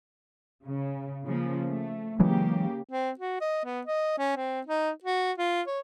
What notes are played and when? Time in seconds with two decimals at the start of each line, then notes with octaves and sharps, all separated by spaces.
0.66 C#3
1.26 C#3 F3 A#3
1.68 A3
2.20 C#3 E3 F#3 G#3 A#3 G4
2.89 C4
3.19 F#4
3.41 D#5
3.65 B3
3.86 D#5
4.18 C#4
4.36 C4
4.67 D#4
5.03 F#4
5.38 F4
5.67 C#5